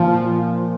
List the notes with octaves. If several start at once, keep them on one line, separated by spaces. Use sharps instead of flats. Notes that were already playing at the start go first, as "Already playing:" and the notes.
Already playing: A#2 F3